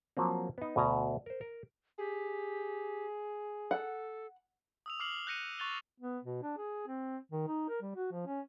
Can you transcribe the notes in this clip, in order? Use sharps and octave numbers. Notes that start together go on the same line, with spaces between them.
F3 F#3 A#3 C4
B3 D#4
D2 B2 G#5 A#5
A#4 C5
A#4
G4 G#4
A4 F#5
D#6 E6 F7
D6 F6 C7 F#7
F#6 G6 A#6 C#7 D#7 F#7
C#6 F#6 A6 F7 G7
B3
B2
D4
G#4
C4
D#3
D#4
A#4
G3
F#4
F3
C#4